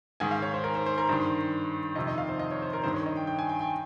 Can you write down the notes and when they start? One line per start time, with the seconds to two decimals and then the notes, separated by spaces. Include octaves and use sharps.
0.20 G#2 D#3 G#5
0.31 F5
0.42 C#5
0.54 C5
0.64 A#4
0.75 C5
0.86 C5
0.98 A#4
1.09 G2 D#3 C5
1.95 F2 C3 D#3 D#5
2.07 D#5
2.18 F5
2.29 C5
2.39 D#5
2.51 C#5
2.62 C5
2.73 A#4
2.84 G2 D#3 C5
2.94 C#5
3.06 D#5
3.17 G5
3.27 G5
3.39 G#5
3.49 G5
3.61 G5